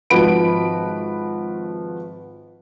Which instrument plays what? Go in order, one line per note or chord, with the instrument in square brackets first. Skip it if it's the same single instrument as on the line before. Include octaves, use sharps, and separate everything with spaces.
[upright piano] G#1 F3 F#4 B4 B5 D7